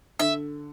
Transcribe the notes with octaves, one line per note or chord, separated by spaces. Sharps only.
D3 E5